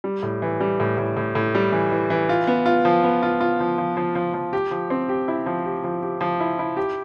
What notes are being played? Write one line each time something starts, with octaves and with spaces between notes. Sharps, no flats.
G3
A2
E3
G3
A2
A2
A2
A2
G3
E3
E3
E3
F4
B3
F4
F3
B3
F4
F4
F3
F3
F3
F3
F3
G4
F3
C4
G4
E4
F3
G4
F3
G4
F3
E4
E4
G4